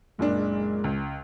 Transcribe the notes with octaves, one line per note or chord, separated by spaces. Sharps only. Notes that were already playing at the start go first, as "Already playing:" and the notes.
F#1 A#2 G#3 D4
C#2